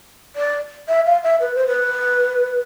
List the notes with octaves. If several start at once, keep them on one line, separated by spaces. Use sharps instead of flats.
D5
E5
F5
E5
B4
C5
B4